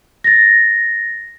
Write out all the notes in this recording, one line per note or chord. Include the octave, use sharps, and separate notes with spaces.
A6 A#6